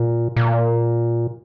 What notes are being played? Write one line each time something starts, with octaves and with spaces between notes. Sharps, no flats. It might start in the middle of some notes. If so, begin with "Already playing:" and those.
Already playing: A#2
A#2